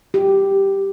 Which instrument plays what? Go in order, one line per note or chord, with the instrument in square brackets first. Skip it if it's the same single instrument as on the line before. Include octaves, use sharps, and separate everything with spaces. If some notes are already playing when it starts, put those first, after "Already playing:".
[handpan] G4